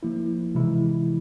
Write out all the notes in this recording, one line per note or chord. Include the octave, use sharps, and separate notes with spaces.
F3 A#3 E4
C3 E3 G#3 E4